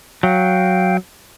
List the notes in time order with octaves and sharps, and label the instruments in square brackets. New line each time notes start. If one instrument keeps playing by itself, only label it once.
[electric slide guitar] F#3 [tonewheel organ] F5 G5